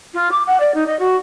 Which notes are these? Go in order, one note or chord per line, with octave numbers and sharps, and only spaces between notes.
F4
D6
F#5
D5
D#4
D#5
F#4